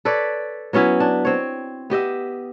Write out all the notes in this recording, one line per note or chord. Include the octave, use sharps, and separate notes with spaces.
A4 B4 C#5 D5
F#3 B3 C#4 E4
D4
C4 C#5
B3 G4 D#5 E5